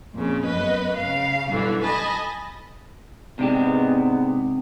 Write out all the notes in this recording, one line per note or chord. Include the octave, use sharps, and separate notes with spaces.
F2 A#2 C#3
F#2 B3 B4 D#5
C#3 F5
F#2 B2 D3 E3 G3
D#5 G#5 A5 B5
G#2 C3 G#3 B3 D4 G4